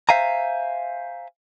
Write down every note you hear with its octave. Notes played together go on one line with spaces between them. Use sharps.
C5 E5 F5 G#5 A#5